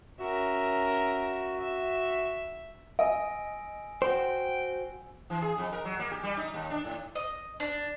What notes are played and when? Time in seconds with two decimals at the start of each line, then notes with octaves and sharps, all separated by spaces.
0.20 C#4 F#4 A#4 E5
1.60 E5
2.99 D#5 G#5 E6 D7
4.02 F#4 C5 G5
5.30 E3
5.42 G#4
5.58 F2
5.73 A#4
5.85 F#3
5.99 A#3
6.11 G4
6.23 G3
6.37 D#4
6.54 D#2
6.70 D4
6.84 A2
7.15 D#5
7.60 D4